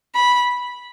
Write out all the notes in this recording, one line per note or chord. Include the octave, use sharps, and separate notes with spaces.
B5